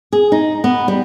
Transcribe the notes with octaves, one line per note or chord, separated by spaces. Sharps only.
G#4
D#4
B3
G3